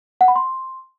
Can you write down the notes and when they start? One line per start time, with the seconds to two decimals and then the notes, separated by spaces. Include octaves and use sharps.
0.21 F#5
0.28 B5
0.36 C6